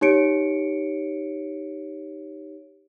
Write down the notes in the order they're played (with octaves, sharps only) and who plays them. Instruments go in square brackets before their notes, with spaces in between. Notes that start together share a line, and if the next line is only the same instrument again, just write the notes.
[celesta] D#4 G4 C#5 C#7 D7